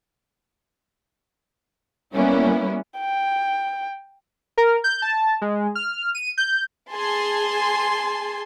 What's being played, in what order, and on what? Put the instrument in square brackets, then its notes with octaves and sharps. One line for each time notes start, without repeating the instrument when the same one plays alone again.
[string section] G3 A#3 B3 C#4 E4
[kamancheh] G5
[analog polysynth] A#4
G6
A5
G#3
F6
D#7
G6
[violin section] G#4 G#5 A5 C6